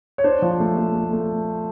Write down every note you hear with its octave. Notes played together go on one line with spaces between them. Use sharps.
C#5
D4 C5
F3
A3
A3
A3
A3